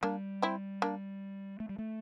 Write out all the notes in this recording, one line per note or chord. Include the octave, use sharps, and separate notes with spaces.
G3 A#3 D4
C4 E4
A#3 D4
A3
G3
A3